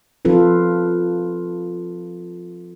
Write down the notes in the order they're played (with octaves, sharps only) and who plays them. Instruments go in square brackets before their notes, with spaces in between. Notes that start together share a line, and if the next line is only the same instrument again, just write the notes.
[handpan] F3 C4 F4 A4 B4